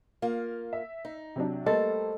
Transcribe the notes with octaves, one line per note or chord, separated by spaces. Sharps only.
A#3 F4
E5
D#4
C3 F#3 D4
G3 A3 A#3 A4 C5 D#5